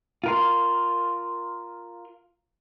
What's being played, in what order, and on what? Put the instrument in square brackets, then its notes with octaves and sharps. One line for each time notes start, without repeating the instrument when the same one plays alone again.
[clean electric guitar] F4 A#4 C6